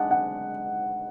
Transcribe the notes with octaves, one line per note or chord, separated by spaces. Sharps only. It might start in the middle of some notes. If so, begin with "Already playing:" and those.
Already playing: G#3 D4 F#5
F#5